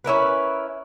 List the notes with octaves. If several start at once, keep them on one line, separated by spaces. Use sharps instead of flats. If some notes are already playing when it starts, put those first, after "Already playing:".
C#4 E4 A#4 B4